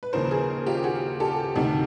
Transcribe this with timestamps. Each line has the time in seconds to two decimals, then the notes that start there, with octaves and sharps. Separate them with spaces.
0.03 B4
0.13 D#2 C#3 F3 A#4 C5
0.31 G#4 A#4
0.66 F4 G4
0.84 F#4 G#4
1.20 G4 A4
1.56 D2 C3 D#3